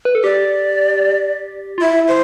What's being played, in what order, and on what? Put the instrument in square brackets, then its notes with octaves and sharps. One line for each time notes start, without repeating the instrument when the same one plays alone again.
[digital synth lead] B4
A4
[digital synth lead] G4 [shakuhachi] D5
[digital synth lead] F4
[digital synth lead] E4 [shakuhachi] E5
[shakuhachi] C5